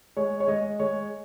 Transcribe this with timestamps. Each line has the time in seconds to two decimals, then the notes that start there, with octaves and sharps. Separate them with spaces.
0.17 G#3 C#5
0.40 C#5
0.48 G#3 D#5
0.80 G#3 C#5